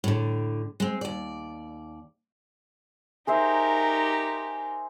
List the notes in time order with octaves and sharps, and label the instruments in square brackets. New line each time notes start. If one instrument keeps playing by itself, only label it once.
[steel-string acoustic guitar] A2 D3
G#3 C4
D#2 D5
[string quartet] D#4 G4 A#4 [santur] G#4 C5 E5